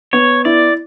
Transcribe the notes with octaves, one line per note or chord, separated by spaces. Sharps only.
B3 C#5
E4 D5